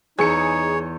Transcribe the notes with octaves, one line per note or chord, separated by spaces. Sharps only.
E2 D#4 G#4 C#5 C#7